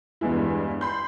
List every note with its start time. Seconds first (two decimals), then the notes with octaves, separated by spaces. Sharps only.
0.21 E2 G2 G#3 E4
0.81 B5 C6 G6